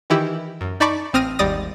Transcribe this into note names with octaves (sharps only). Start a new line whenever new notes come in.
D#3 E3 E4 G4
F#2
D#4 D5 A5 B5 C#6 D6
A1 C4 D#6 F6 A#6 D#7
G#1 D#2 G3 D5 D#6 A#6